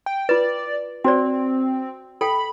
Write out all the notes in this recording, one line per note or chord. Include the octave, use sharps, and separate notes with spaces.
G5
F4 B4 D5
C4 F#4 C5 D5
A4 G5 B5